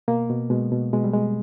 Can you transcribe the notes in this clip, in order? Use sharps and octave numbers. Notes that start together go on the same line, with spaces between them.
B2 A#3
B2
B2 G#3
B2
B2 G#3
G3
B2 G#3